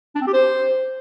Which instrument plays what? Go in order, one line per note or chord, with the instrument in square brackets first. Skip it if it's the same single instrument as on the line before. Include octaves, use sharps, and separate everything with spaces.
[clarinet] D4
C4
G4
C5